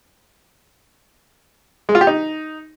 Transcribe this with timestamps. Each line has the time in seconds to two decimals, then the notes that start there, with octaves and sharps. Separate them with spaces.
1.89 G#3
1.95 F4
2.01 G4
2.07 D#4